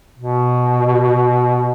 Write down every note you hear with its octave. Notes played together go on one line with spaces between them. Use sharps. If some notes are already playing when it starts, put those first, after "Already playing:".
B2